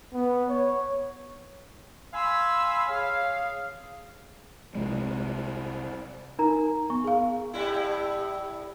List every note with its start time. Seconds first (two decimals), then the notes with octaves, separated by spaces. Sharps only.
0.13 B3
0.50 C#5
2.13 F5 G#5 B5 C6 E6
2.88 G#4 C#5 F5
4.75 C2 C3 G#3
6.39 D#4 A#4 A#5
6.90 B3 C#6
7.04 G#4 F5
7.54 A2 G3 E4